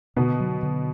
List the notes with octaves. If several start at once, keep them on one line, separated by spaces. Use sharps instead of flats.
B2 D3 B3
F#3
D3